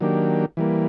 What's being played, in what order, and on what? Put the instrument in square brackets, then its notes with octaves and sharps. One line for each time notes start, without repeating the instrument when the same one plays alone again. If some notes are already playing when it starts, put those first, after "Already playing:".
[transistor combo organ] D#3 F#3 A#3 D4 G4
E3 G3 A#3